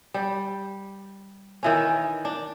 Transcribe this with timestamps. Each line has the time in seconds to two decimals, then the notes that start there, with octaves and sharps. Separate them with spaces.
0.14 G3
1.63 D#3 E3 C#4
2.25 D4